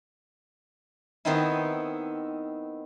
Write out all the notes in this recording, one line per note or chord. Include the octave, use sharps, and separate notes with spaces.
D#3 B3 C4 D#4 E4